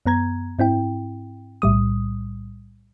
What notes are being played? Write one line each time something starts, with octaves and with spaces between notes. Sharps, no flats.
F#2 B3 A#5 G#6
G#2 C4 E4 G5
B1 A2 G3 D#6